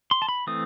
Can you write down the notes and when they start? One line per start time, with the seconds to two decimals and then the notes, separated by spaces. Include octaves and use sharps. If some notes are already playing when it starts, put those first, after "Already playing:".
0.11 C6
0.22 A5
0.28 B5
0.47 E3 A3 C4 D#6